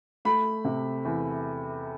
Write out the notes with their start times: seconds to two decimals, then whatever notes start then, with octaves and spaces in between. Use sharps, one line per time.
0.25 A3 B5
0.64 C3
1.05 E2